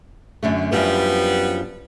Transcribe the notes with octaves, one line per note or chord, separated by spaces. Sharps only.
F#2 D3 A3
F#2 F3 G3 B3 D4